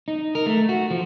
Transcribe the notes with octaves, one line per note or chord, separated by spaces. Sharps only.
D#4
A#4
A3
F#4
F3